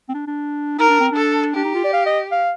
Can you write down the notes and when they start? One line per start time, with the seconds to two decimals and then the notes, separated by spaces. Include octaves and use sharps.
0.09 C4
0.14 D4
0.28 D4
0.78 D#4 A#4
0.89 D4
1.00 C4
1.12 D4 A4
1.55 D4 G4
1.65 D#4
1.75 F4
1.84 D5
1.93 F5
2.06 D#5
2.32 F5